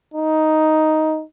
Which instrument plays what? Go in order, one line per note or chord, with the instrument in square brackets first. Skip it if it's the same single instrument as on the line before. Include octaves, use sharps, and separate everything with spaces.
[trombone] D#4